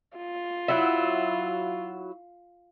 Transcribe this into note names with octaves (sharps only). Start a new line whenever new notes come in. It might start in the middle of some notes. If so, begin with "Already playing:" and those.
F4
F#3 E4